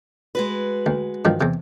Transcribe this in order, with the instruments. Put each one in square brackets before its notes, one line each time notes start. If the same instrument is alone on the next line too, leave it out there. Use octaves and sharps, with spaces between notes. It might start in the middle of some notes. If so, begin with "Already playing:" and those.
[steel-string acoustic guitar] G#3 F#4 B4
[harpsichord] D2
G2 D#3 F3
E2 C3